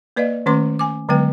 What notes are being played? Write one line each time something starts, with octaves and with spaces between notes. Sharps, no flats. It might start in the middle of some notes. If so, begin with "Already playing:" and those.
A#3 B4 D5 D#5 F5
D#3 A3 C#4 B4 C6 D6
G#5 D6
D3 F#3 G#3 B3 B4 G5